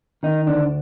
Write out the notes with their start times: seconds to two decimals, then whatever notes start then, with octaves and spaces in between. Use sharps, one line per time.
0.23 D#3 D#4
0.47 D2 D4